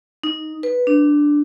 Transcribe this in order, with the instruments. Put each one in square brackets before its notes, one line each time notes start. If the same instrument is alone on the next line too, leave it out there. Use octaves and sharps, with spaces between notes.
[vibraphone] D#4
B4
D4